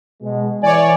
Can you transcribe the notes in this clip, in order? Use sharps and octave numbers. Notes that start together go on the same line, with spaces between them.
B2 G#3
E3 C#5 D5 G#5